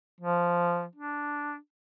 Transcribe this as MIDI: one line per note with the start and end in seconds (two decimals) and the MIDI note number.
0.20 0.86 53
0.96 1.56 62